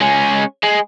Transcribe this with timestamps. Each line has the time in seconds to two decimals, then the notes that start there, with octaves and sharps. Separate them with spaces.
0.01 G#3 C#4
0.64 G#3